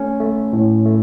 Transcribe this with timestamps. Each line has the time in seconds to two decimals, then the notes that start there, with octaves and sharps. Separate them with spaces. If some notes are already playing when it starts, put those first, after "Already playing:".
Already playing: A3 C#4
0.20 A3
0.53 A2
0.85 A3